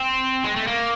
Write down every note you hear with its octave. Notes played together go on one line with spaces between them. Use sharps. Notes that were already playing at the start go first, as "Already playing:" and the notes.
Already playing: C4
G#3
A3
A#3